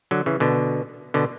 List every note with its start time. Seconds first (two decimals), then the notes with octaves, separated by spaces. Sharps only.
0.11 D3 F#3
0.26 C#3 E3
0.40 B2 D3
1.14 B2 D3